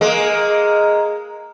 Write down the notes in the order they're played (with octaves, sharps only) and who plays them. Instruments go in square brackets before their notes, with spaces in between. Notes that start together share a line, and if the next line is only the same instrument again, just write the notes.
[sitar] G#3 A#3